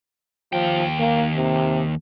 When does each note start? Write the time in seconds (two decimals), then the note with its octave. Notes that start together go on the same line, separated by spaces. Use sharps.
0.53 D#2 F3 G5
1.00 A#3
1.36 C3